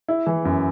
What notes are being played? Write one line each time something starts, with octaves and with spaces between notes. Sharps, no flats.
E4
E3
F#2